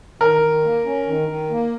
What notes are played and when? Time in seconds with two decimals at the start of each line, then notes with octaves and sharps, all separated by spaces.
0.20 D#3 A#4
0.42 D#3
0.64 A#3
0.86 C#4
1.07 D#3
1.28 D#3
1.51 A#3